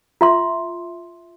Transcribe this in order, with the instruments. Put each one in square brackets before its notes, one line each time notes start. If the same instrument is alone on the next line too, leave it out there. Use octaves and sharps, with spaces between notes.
[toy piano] F4 E5 C6